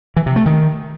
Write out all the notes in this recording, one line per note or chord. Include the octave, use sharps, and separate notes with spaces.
E3
C3
A3
D#3